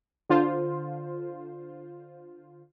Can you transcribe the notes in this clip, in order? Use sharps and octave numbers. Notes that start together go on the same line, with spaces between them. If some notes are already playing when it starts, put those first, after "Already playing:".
D3 F4 C5